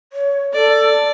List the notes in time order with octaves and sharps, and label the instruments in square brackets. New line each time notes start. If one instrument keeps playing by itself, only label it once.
[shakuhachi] C#5
[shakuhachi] A4 [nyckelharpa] D5